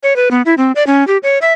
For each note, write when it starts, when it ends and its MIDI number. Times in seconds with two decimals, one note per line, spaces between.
0.03 0.16 73
0.16 0.29 71
0.31 0.42 59
0.46 0.54 64
0.58 0.72 60
0.76 0.86 74
0.87 1.06 61
1.07 1.18 67
1.23 1.38 73
1.42 1.53 76